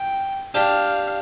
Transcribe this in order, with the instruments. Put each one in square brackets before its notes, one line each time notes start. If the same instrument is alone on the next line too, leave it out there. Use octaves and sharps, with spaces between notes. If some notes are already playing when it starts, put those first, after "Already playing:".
Already playing: [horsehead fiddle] G5
[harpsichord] D4 G4 [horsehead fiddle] F5